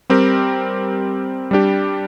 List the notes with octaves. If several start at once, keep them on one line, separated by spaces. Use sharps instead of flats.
G3 C4 G4 A#4
G3 D4 G4